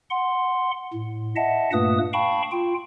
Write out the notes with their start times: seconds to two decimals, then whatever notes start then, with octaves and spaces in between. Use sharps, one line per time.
0.10 F#5 C6
0.93 A2
1.36 D#5 E5 F#5 A5
1.73 G2 A#2 A3 A#3 B4 D#6
2.13 F5 G5 A5 B5 C#6
2.52 F4 G5